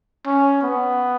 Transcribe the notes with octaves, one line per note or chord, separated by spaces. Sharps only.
C#4
B3